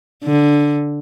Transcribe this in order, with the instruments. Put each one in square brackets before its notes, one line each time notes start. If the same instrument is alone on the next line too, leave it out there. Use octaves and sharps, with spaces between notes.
[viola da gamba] D3